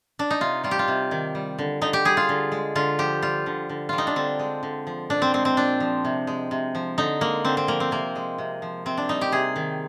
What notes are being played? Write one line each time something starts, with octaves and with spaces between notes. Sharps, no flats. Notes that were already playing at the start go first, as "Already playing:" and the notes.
D4
D#4
C3 F4
G3 F4
G4
F4
C3
D#3
G3
D3
D3 D#4
G4
G3 G#4
F4
D3
G#3
D3 F4
F3 G4
G3 F4
D3
D3
G3 F4
D#4
D4
D3 C4
G#3
D3
F3
A#2 D4
C4
G#3 C4
C4
A#2 D4
F3
C3
G#3
C3
F3
D3 D#4
G#3 A#3
D3 C4
C4
F3 A#3
C4
C3 A#3
G#3
C3
F3
C3 C4
D4
G3 D#4
G4
C3 G#4
D#3